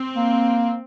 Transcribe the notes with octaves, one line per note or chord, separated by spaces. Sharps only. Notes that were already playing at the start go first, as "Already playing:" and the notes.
Already playing: C4
A#3